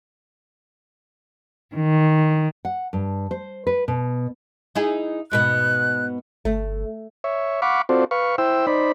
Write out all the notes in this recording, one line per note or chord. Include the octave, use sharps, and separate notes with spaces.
D#3
F#5
G2
C5
B4
B2
D#4 E4 G#4
G#2 B2 B3 F#6
G1 A3
C#5 E5
F5 F#5 B5 C#6 D6
C4 F4 F#4 A4 C5 D5
B4 F5 C#6
E4 C5 G5 E6
D#4 C5 D5 B5